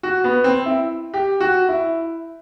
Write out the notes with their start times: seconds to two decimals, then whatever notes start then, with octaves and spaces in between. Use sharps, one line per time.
0.03 F#4
0.24 B3
0.44 C4
0.66 E4
1.14 G4
1.40 F#4
1.69 E4